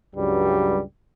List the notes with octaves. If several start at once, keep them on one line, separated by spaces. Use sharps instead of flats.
C#2 G2 F#3 G3